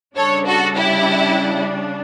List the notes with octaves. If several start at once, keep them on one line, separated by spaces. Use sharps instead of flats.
C#3 G3 D4 A4 C#5
F#4 A4
E4 G4